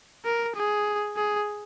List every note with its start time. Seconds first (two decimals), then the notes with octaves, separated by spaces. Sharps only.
0.25 A#4
0.56 G#4
1.16 G#4